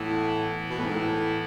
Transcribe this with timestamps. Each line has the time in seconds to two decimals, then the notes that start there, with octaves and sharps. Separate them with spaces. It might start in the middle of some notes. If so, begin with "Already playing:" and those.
Already playing: A2 E3 B3 E4
0.70 B2
0.78 A2
0.86 G#2
0.95 A2